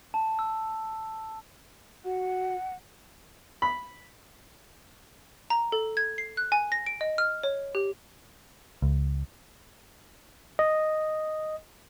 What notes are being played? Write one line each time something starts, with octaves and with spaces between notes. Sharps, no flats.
A5
E6
F#4 F#5
B5
A#5
A4
G#6
C7
F#6
G#5
A#6
D7
D#5
F6
C#5
G4
C#2
D#5